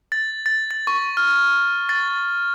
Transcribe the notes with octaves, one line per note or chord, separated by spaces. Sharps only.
A6
A6
A6
C#6
F6
A6